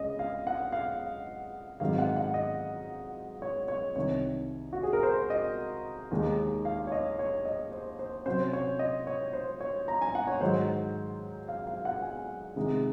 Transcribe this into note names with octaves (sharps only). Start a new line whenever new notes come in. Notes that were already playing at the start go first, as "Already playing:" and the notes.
Already playing: C#2 C#3 G#3 C#4 D#5
F5
F#5
F5
G#2 D#3 F#3 C4 F5
F#5
F#5
D#5
C#5
C#5
C2 C3 D#3 C#5
F#4
G#4
A#4
C5
D#5
D#2 D#3 G#3 D#4
F5
C#5
D#5
C#5
D#5
C5
C5
C3 F#3 C#4 C5
C#5
D#5
C#5
C5
C#5
A#5
G#5
F#5
C#5
G#2 D#3 F#3 C5
F5
F5
F#5
G#5
C3 D#3 G#3 D#4